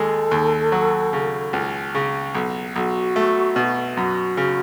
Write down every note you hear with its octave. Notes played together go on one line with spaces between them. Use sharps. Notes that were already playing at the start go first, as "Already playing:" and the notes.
Already playing: D#2 G#3 A4
D#2
F#3
C#3
C#2
C#3
B1
B1 F#4
A3
B2
F#2 F#4
C#3